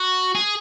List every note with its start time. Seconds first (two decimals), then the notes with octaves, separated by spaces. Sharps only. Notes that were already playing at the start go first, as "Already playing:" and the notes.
Already playing: F#4
0.35 G#4